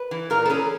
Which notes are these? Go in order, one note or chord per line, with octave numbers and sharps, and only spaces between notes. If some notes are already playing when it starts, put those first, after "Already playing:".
Already playing: B4
E3
A#2 A#4
A4
C#4 G#4